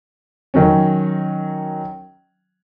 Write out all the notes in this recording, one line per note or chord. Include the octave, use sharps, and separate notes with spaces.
D#3 F#3 C#4